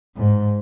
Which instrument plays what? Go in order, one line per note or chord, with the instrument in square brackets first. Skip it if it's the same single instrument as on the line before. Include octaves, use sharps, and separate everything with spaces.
[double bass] G#2